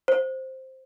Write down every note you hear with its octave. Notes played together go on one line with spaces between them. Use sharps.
C5